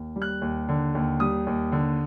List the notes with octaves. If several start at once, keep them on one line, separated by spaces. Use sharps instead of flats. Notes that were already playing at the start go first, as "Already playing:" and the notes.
Already playing: D#2
G3
F#6
D#2
D3
D#2
G3 D#6
D#2
D3